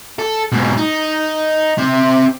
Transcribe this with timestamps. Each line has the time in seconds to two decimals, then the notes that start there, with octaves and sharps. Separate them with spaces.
0.19 A4
0.52 G#2 B2
0.78 D#4
1.79 C4 E5